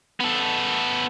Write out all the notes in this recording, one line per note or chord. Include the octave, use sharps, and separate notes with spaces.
B3 A4